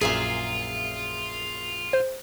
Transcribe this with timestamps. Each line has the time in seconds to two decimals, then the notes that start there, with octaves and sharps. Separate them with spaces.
0.01 A#1 F#2 A#2 F4 G#4 E5 F5
1.93 C5